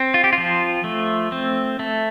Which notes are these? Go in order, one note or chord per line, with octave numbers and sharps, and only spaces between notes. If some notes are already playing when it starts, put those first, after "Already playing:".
Already playing: C4
F4
G4
F3 F4
A3
C4
A3